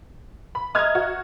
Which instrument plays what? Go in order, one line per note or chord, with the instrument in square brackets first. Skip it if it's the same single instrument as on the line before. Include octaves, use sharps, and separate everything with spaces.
[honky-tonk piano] B5
[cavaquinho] D#5 E5 A#5 [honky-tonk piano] D#6 F6 G#6
[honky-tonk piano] F#4